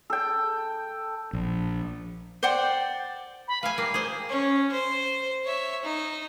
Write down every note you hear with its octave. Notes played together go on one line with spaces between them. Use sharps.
A4 G5
A#1
C5 D5 F#5 G5
B5
B4 E5 F5 G#5
G3 A#3 C7
G#4 C5
C#4
C5
C#5 E5
D#4